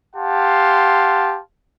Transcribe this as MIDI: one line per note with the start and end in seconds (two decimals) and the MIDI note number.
0.16 1.40 67
0.16 1.40 77
0.16 1.40 78
0.16 1.40 81
0.16 1.40 84